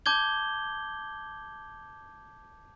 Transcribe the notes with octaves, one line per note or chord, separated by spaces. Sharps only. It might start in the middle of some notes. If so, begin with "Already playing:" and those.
A5 D6 G6 G#6 G7